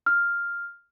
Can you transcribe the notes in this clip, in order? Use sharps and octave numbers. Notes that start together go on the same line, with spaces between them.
F6